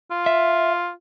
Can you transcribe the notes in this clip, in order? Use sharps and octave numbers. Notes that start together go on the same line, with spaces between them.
F4
E5